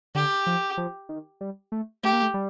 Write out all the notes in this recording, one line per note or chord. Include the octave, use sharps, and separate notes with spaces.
D3 G4
F3
F3
D#3
G3
A3
A3 G4
A#3
A3
G3